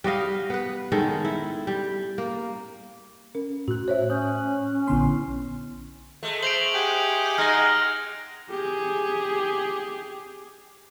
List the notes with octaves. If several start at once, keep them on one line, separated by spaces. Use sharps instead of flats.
G3 F#4 D#5 F5
B3 B4
D#3 G#3 C#4 A4
E4
G3
A#3
C#4 A#4
A2 F#4 F#6
C5 C#5 E5
C#4 D#6 F#6 G6
C#4
A#1 D3 B3 E4 C6
G#3 A3
C5 D7 F7 F#7
G4 G#4 F#5 G#5
G#3 D#4 F6 A#6
G4 G#4